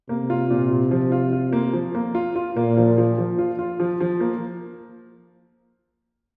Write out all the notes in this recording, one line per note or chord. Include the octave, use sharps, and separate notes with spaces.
C3 A#3
F4
A#2
F4
F3
F4
F4
A#3
F3
A#3
F4
F4
A#2 A#3
F3
F3
F3
F4
F4
F3
F3
A#3